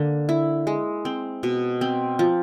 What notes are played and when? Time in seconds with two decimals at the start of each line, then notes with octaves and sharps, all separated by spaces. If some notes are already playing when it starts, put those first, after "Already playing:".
Already playing: D3 A#3
0.29 E4
0.67 G#3
1.05 C4
1.43 B2
1.81 C4
2.19 F3